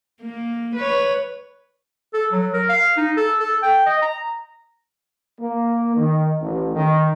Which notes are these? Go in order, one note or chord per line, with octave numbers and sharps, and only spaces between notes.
A#3
B4 C#5
A4
F#3
A#4
F5
D#4
A4
A4
G5
D#5
A#5
A#3
D#3
A1
D#3